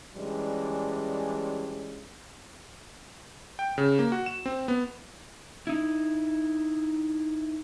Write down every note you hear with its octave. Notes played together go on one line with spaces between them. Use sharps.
E3 G3 G#3 C#4 D4
G5
C#3
A#3
F#4
E7
C4
B3
D#4 E4